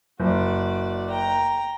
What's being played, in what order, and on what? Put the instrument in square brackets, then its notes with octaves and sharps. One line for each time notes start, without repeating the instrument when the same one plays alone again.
[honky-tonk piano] F#1 [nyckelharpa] F#4 D5
[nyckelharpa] G5 A#5